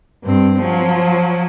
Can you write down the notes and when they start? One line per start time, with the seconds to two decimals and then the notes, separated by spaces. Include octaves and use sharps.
0.24 G2 C4
0.62 F3 F#3